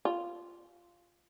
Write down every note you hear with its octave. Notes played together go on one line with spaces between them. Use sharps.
F4